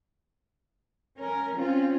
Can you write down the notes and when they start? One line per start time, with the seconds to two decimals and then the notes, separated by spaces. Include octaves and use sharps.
1.17 C#4 A#4
1.54 C4 C#4 F4